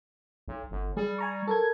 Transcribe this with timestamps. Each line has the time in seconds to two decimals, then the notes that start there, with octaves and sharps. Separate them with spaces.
0.48 B1
0.71 G1
0.97 G3 G#4
1.18 G#5 A#5 C#6
1.47 A4 A#4 G#6